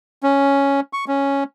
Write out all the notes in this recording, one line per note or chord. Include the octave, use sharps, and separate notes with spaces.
C#4
C#6
C#4